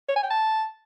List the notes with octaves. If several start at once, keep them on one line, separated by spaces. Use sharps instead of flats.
C#5
G#5
G5
A5